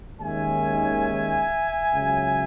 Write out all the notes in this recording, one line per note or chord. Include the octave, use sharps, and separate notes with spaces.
D#2 D#3 G#3 C#4 E5 G#5
C#2 C#3 F#3